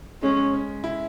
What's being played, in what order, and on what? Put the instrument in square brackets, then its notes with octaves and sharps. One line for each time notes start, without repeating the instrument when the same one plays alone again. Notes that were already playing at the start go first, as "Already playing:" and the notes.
[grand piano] G#3 [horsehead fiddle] C#4
[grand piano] C#4
E4